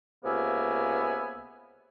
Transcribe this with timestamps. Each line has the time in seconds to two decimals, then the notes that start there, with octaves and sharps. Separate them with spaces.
0.24 C#2 C3 A#3 B3 E5 G#5